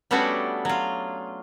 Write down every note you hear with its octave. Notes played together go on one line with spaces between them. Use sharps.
G3 A3 B3 C#4 D4 F#4
F#3 F4